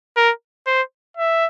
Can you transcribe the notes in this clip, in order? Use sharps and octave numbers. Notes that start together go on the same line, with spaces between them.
A#4
C5
E5